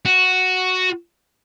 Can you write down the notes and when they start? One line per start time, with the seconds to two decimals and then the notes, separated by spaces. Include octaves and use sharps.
0.06 F#4